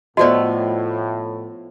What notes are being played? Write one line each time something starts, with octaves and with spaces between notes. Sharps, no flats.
A2 F3 A3 B3 F#4 C5 D5 D#5